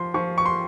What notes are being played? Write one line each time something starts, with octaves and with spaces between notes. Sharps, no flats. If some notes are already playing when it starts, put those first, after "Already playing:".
Already playing: F3 C6
F3 C#6
C#6
C6